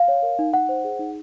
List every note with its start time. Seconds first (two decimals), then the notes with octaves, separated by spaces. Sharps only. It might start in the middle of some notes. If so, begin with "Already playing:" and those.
Already playing: F5
0.08 C#5
0.22 A#4
0.39 D#4
0.53 D#4 F#5
0.69 C5
0.84 G#4
0.99 D#4